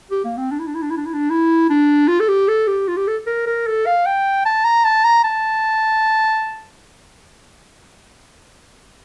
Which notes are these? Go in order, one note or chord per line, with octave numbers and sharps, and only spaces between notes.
G4
A#3
C4
D4
E4
D4
E4
D4
E4
D4
E4
D4
E4
D4
F4
A4
G4
A4
G4
F4
G4
A4
A#4
A#4
A4
F5
G5
A5
A#5
A5
A#5
A5